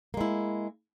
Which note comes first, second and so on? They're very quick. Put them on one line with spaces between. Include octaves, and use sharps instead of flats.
A#3 G#3 E4